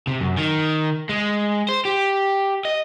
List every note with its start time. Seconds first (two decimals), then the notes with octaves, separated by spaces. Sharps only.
0.07 C3
0.20 F#2
0.38 D#3
1.09 G#3
1.69 C5
1.85 G4
2.65 D#5